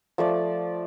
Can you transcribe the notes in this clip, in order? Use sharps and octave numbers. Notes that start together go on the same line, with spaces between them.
F3 A3 D5